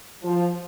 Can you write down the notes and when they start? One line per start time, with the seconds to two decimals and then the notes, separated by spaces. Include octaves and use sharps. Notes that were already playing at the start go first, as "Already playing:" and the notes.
0.23 F3